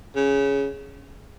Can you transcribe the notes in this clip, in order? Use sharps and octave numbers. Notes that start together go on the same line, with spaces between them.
C#3